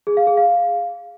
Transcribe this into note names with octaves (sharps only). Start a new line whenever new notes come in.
G#4
F5
G#4
F5